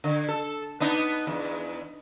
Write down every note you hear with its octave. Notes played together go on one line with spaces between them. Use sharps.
D3
A4
B3 D4 D#4
E2